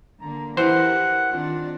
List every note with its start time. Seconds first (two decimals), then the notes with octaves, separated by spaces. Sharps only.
0.21 D3 A#3 A#5
0.57 E3 E4 G4 A#4 C5 F#5
1.32 D#3 C4 D4 F4